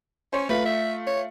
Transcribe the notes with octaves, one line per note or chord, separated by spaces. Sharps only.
C#4 C5 C#5
A3 F4 B4
E5
C#5